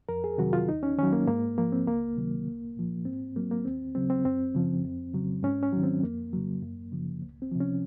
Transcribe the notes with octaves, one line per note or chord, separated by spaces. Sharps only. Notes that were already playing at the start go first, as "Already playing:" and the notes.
F2 A#4
G#4
C3 D#3 F#3 F#4
F4
D#2 D#4
C#4
D#3 F#3 C#4
A#3
G#2 A#3
F3 A#3
C4
C#2 A#3
C3 D#3 F#3
C2
A#2 F3
G#2 C4
F#3 A#3
A#3
D#2 C4
C#3 F#3 C4
C4
F#2 C4
C#3 F3
F2
C#3 F#3
G#2 C#4
C#4
D#3 F#3
C4
F2 A#3
C#3 F#3
F#2
C#3 F3
C#2
C4
C3 F3
C#4